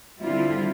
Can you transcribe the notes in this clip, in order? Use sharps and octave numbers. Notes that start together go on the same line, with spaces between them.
D3 G3 C4 E4 F4